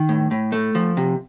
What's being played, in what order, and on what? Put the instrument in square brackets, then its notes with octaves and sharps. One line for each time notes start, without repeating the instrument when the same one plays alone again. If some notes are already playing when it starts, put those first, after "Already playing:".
Already playing: [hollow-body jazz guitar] D#3
A2
A2
A3
F3
C3